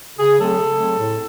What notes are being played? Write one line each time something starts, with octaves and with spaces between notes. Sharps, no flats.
C#3 G#4
F#3 A3 C4 A4
C#3
F#3 A3 C4
A2